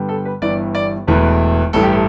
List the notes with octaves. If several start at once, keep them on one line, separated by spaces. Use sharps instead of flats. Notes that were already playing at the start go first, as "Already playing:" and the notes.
Already playing: G2 D3 G3 B3
A4
B4
G1 G2 E3 B3 D5
D5
E1 E2 E3 A3 B4
A1 G2 E3 A4
G4
A4